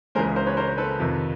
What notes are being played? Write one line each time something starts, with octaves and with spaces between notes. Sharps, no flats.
C#2 C#3 E3 G#3 A#4 C5
A#4 C5
B4 C#5
A#4 C5
C5
A4 B4
F2 C3 D#3